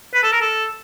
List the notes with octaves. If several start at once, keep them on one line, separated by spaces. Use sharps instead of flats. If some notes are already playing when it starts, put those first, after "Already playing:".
B4
A4
A#4
A4